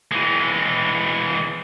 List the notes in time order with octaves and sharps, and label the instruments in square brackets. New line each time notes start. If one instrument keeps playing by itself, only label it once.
[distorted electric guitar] E3 G#3